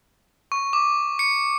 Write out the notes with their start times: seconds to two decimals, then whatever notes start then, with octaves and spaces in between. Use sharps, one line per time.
0.52 C#6
0.73 D6
1.19 C#7